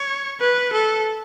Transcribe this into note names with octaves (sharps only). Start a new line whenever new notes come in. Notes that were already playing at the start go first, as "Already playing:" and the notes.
Already playing: C#5
B4
A4